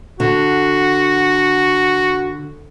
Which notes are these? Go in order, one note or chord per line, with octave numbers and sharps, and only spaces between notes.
D3 F#4